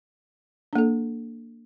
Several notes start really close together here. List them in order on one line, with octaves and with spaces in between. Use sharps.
D4 A#3 A4